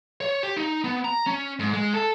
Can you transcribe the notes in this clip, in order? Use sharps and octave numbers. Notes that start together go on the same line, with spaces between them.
C#5
G4
D#4
B3
A#5
C#4
G#2
G#3
A4